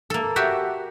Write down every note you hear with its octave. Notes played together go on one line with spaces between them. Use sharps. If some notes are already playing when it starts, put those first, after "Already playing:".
A#3 A4
F#4 G4 E5